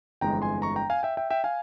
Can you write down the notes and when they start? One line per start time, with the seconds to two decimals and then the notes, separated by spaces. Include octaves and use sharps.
0.21 G1 F2 E3 G#3 G5 A#5
0.42 G#5 C6
0.62 A#5 C#6
0.76 G5 A#5
0.90 F5 G#5
1.03 E5 G5
1.17 E5 G5
1.30 E5 G5
1.44 F5 G#5